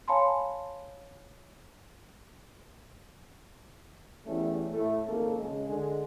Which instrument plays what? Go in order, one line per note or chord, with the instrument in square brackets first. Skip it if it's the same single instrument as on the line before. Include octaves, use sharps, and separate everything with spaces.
[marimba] C#5 F5 G#5 A5 B5 C6
[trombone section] E2 E3 G3 A3 C#4
A2 A3
G#1 F2 C#3 A#3 A4
C#3 G#3
D3 G#3